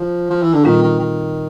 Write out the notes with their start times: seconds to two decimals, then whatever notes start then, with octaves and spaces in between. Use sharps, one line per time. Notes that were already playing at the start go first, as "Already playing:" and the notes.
Already playing: F3
0.30 F3
0.42 E3
0.53 D3
0.65 A#2 D#3 G3 C4 F4
0.82 D#3
1.00 D#3